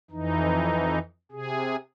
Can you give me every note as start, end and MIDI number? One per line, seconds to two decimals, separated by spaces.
0.11 0.99 41
0.11 0.99 52
0.11 0.99 63
1.31 1.76 48
1.31 1.76 68